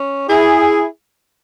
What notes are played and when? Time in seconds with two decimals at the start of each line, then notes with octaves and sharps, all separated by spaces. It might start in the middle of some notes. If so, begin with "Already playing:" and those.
Already playing: C#4
0.29 E4 G#4